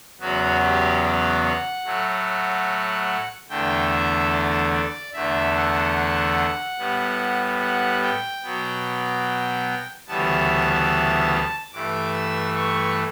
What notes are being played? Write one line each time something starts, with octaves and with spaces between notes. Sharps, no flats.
E2 C#3 F#3 B3 F#4
G4
D5
F#5
A2 F#3 A3
E2 D3 A3 G5
E5
D5
D5
E2 D3 A3 E5
F#5
A2 G3 B3
F#5
G5
B2 F#3 B3
D2 C#3 E3 G3 B3 A5
G2 E3 A3 D6
E6
C#6